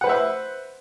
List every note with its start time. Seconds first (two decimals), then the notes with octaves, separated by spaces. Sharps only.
0.01 F#5
0.04 B4
0.07 C5
0.09 E5